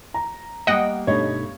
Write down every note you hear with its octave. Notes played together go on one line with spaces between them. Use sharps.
A#5
G3 A#3 D#5 F#5 G5
G2 B2 A3 D#4 C#5